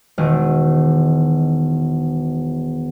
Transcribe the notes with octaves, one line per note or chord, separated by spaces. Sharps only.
E1 D#3